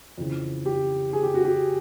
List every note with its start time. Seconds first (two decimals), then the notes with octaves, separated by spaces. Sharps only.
0.18 F2 C#3 E3
0.66 G4
1.13 G#4
1.23 G4
1.34 F#4
1.45 G4